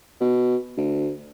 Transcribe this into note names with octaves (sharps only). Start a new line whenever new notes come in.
B2
D2